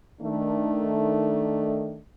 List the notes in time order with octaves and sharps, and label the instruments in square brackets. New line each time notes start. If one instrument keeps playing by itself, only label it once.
[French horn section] D#3 A3 D4